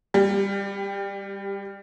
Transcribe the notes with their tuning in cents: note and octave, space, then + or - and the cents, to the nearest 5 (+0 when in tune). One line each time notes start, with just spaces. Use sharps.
G3 +20 G4 +0